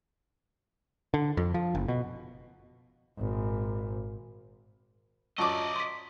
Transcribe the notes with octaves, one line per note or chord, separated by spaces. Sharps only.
D3
F2
F3
F#1
B2
G#1 A#2
F#2 F4 D5 D#5 A5 C#6 D6
C6 B6